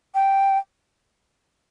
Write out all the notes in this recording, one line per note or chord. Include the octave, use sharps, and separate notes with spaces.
G5